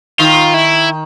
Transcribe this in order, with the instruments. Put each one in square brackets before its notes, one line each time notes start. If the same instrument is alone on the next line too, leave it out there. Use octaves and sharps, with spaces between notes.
[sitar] D#3 [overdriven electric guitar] F4
[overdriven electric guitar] E4